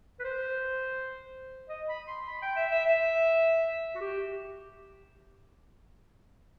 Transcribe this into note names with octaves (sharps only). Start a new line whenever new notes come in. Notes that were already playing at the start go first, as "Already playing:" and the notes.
B4
C5
D#5
B5
C6
B5
G5
E5
E5
E5
F#4
G4